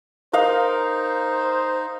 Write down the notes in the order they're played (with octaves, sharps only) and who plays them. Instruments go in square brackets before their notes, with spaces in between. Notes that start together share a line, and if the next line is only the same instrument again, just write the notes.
[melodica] D#4 [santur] A#4 D#5 F5 [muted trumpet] C5